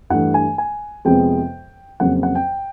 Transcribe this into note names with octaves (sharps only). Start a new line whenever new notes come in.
G2 E3 A3 F#5
G#5
G#5
F2 C3 F3 G#3 B3 G5
F2 C#3 F#3 A#3 F#5
F#5
G5